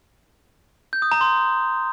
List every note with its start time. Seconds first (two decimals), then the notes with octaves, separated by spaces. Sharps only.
0.93 G6
1.02 D#6
1.12 A#5
1.21 C6